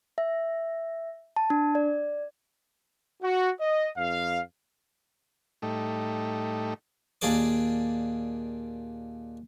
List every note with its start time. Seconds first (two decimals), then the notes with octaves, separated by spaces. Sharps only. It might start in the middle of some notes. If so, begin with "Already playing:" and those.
0.18 E5
1.36 A5
1.50 D4
1.75 D5
3.23 F#4
3.59 D#5
3.96 F2 F5
5.62 A2 G3 A3 D#4
7.21 D#2 A#2 D4 G#4 D5 D6